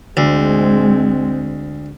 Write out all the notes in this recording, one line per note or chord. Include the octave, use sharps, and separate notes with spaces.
D2 G#3 C4